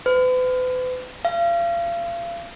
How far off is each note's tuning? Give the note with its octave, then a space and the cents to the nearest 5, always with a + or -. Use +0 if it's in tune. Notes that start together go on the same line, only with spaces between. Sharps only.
B4 +40
F5 -35